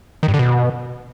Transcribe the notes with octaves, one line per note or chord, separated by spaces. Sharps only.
D#3
G2
D3
B2